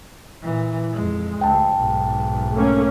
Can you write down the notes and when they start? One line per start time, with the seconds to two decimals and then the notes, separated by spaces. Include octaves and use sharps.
0.43 A#2 E3
0.93 F2 G#3
1.41 D2 G5 A5
1.75 B1 G#2
2.53 A3 A#3 C#4